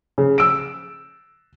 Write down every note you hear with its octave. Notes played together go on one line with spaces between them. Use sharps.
C#3
E6 D7